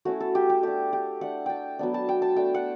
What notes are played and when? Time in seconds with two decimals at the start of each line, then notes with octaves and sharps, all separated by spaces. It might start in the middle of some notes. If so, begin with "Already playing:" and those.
0.05 A3 C#4 E4 F#4
0.20 A4
0.35 G4
0.50 G4
0.63 A3 D4 G4
0.93 G4
1.21 A3 D4 F#5
1.46 G5 A5
1.79 F#3 B3 D4
1.94 A5
2.09 G5
2.22 A5
2.36 A3 D4 G5
2.54 F#5